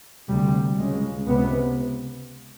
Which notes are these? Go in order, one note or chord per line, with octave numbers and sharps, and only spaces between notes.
D2 C3 G3
C#2 C#3 G#3
C#2 C3 B3